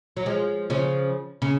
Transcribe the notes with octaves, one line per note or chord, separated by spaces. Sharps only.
F#3
F3 G#3
C#3 F3
C#3